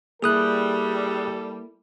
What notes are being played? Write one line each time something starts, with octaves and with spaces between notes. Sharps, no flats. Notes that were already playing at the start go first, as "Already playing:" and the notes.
G3 A#3 E4 G#4 A4 D#6 F#6